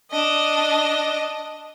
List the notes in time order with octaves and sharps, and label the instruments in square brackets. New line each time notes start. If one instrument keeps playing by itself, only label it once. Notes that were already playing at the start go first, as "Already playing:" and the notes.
[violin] D4 D#5